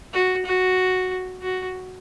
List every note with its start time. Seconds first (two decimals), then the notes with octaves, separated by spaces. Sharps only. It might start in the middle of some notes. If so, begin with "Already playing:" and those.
0.13 F#4
0.45 F#4
1.42 F#4